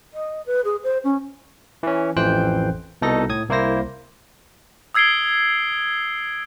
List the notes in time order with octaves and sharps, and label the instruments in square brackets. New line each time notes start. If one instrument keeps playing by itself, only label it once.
[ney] D#5
B4
G#4
C5
C#4
[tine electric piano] E3 C#4
A1 F2 E3 C5 G5 F#6
C2 B2 D#4 A4 A#6
A2 D#6 G#6
C2 A#3 E4 C5 A#6
[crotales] D#6 E6 G#6 C7 D7 G7